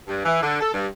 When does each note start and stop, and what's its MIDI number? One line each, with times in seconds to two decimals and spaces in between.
0.07 0.23 43
0.25 0.41 52
0.42 0.59 50
0.61 0.72 69
0.73 0.86 43